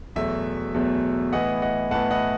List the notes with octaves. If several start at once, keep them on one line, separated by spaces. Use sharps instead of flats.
E2 B2 F#3 A3 E5
E2 B2 F#3 A3
A2 E3 B3 D#5 F#5
D#5 F#5
A2 E3 B3 F#5 A5
D#5 F#5